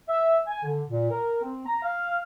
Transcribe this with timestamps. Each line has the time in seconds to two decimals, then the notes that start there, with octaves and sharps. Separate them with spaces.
0.09 E5
0.47 G#5
0.64 D3
0.89 A#2
1.11 A#4
1.42 C4
1.66 A#5
1.83 F5